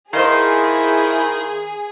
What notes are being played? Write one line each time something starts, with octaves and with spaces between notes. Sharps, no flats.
D#3 E4 G#4 C5 D#5 F5